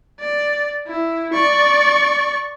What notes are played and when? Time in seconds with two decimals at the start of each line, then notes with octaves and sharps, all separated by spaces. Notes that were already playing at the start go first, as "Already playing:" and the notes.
0.20 D5
0.87 E4
1.33 D5 C#6